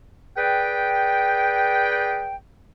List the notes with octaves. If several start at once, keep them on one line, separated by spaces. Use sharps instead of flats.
G#4 B4 D5 G5